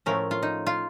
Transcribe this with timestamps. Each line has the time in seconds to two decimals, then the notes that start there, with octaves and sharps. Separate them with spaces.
0.06 A2 F3 A3 C#4 A#4
0.31 F4
0.43 D#4
0.67 F4